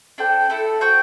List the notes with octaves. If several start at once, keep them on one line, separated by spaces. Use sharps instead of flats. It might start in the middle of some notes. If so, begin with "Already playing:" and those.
D4 A4 C5 G5
A3 E4 A4
F#4 C5 G5